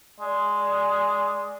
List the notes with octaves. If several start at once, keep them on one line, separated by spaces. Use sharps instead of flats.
G#3 D5